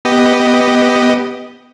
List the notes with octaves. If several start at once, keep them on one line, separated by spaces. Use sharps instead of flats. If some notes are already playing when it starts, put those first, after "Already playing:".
B3 G4 D#5